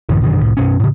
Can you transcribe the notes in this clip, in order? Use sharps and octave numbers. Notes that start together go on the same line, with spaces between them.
A1 F#2 D3 E3
F#2 B2 D3 D#3
C2 A2
F#2 B2 C#4
A2 C#3